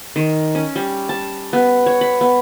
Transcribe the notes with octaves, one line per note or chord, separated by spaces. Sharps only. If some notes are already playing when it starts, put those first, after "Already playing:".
D#3
C#4
G3
A5
B3
C#5
B5
B3